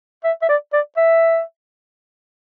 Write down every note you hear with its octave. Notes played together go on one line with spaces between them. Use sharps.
E5
E5
D5
D5
E5